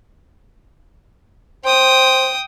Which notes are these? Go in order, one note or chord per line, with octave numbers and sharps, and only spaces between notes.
C5 G5 D#6